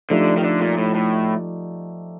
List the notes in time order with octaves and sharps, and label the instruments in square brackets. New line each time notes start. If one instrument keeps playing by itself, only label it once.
[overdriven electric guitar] D3 [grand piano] F3 A3 D#4 G4 D5
[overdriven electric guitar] D#3
D3
A#2
A2
A2